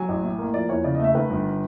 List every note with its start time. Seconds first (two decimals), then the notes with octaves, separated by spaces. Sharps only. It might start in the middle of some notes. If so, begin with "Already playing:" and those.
Already playing: F#3 G#5
0.08 A1
0.23 A2
0.39 A#3
0.54 F3 D5
0.69 E2 C#5
0.84 C#3 D5
0.95 D#5
1.00 A3 E5
1.15 D#3 B4
1.30 G1